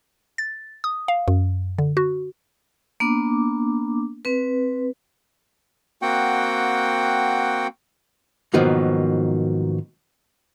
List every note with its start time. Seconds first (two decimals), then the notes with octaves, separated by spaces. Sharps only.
0.38 A6
0.84 D#6
1.08 F5
1.28 F#2
1.78 D3
1.97 F#4
3.00 A#3 B3 D4 D6
4.25 C4 B4
6.02 A#3 C4 F#4 F#5 G5
8.54 G#2 B2 D#3 F3 F#3 A#3